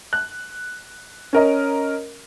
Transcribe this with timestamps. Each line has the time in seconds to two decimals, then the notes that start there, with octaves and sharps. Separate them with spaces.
0.13 F#6
1.33 C#4 A#4 D#5